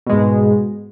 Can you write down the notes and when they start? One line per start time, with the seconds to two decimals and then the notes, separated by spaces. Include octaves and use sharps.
0.07 B2
0.09 G#3
0.12 G#2